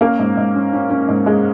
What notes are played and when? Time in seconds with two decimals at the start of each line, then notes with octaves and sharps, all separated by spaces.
0.01 A#3 C#4 A#4
0.19 G#2
0.37 G#2
0.56 C#4
0.73 C#4
0.90 C#4
1.09 G#2
1.26 G#3